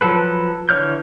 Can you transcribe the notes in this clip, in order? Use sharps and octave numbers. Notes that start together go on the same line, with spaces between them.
F3 F#3 A4 B4
D3 E3 C#5 F6 G6